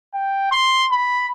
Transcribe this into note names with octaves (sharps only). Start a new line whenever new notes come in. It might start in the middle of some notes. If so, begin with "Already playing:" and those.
G5
C6
B5